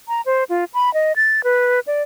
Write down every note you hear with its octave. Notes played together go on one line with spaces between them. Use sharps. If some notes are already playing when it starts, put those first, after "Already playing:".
A#5
C5
F4
B5
D#5
A6
B4
D5